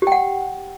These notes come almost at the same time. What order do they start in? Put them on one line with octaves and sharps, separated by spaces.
G4 G5 F#5